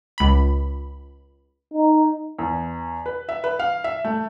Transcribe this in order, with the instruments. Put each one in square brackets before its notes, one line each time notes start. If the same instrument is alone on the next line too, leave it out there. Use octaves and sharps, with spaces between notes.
[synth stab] C#2 B5
[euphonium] D#4
[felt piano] E2
B4
E5
B4
F5
E5
A3